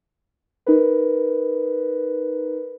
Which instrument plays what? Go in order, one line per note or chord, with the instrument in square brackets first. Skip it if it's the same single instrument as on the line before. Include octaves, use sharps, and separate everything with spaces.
[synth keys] D#4 A#4 B4